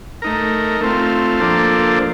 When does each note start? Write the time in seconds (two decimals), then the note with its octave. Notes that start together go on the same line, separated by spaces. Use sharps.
0.22 A3 D#4 A#4
0.81 A3 C4 F4
1.40 F3 A#3 D4 A4 C5